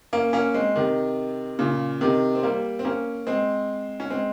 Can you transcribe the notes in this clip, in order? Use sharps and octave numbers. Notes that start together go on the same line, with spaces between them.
A#3 C#4
A#3 C#4
G#3 C4
C3 D#3
A#2 C#3
C3 D#3
C4
G3 A#3
C4
A#3 C#4
G#3 C4
C#4
G#3 C4